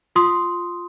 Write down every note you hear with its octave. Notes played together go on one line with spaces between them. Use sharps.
F4 C6 D#6